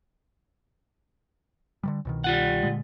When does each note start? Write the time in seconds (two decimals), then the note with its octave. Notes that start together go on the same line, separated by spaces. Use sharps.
1.83 D3 D#3 G3
2.05 C2 B2 D#3
2.24 G3 F4 F#5
2.63 A#2 D3 G#3